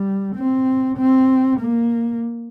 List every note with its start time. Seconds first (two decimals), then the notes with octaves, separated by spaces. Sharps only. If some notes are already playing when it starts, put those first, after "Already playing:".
Already playing: G3
0.36 C4
0.97 C4
1.60 A#3